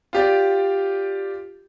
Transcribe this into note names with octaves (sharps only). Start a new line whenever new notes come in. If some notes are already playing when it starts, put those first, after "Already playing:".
F4 G4 D5